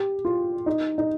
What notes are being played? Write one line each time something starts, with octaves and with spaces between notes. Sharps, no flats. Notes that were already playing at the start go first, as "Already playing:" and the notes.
Already playing: G4
F4
D#4
D#4